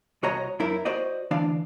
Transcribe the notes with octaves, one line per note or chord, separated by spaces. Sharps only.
C2 F#4 C#5 D#5 A#5
F#2 D#4 E4 A#4
F#4 C5 D5 D#5
D2 E3 D4 D5 F5